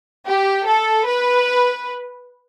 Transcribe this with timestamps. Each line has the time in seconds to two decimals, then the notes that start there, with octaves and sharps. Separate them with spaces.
0.27 G4
0.66 A4
1.06 B4